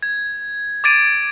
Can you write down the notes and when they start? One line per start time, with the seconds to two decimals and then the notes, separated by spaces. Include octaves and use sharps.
0.02 G#6
0.84 D6 G#6 A6 D7 D#7